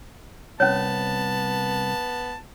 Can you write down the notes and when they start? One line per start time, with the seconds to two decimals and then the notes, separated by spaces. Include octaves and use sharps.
0.60 C2 B3 C#4 C#5 A5